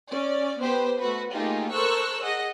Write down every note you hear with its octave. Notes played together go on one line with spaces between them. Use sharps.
C#4 D5
B3 G4 B4 C5
A3 F#4 B4
A3 A#3 D#4 F4 G4 G#4
A4 A#4 C5 C#6 E6 F#6
G#4 D#5 F#5